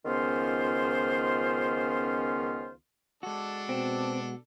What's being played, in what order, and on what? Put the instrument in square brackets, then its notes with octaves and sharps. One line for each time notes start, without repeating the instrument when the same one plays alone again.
[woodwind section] C#2 D#3 B3 C#4 F4 C5
[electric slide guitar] G#3 F#4 [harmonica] D4 A4
[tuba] B2 [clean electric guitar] C4